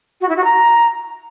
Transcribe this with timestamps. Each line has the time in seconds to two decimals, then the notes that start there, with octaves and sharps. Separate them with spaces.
0.20 F#4
0.28 E4
0.36 F#4
0.44 A#5